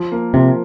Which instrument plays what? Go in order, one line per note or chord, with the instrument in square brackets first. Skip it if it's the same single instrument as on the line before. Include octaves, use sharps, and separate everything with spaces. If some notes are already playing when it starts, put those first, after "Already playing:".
Already playing: [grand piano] F3
A#3
[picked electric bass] C3 [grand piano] F3